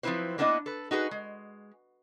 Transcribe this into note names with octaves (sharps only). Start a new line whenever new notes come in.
F3 F#3 C4 E4 B4 C5
A#3 B3 D4 E4 B4 D#5
A4 B4
D#4 F#4 G#4 B4
G#3